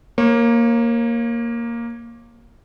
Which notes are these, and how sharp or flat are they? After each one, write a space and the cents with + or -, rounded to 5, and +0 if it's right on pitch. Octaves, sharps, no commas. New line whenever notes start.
A#3 +0 C#5 -30